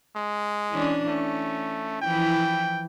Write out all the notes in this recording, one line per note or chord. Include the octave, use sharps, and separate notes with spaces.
G#3
E3 C#4 D4
A3 C#4
E3 F3 E4 G5